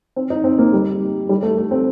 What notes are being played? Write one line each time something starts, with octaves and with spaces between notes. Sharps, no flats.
C4
D#4
C4
A#3
G3
G3
A3
A3
C4